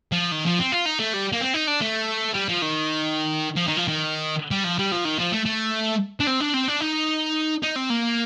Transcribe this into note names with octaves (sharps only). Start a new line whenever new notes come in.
F3
D#3
F3
C4
F4
D#4
A3
G3
A#3
C4
D#4
D4
A3
G3
F3
D#3
F3
D#3
F3
D#3
G3
F3
G3
F3
D#3
F3
A3
A3
D4
C4
D4
C4
D4
D#4
D#4
C4
A#3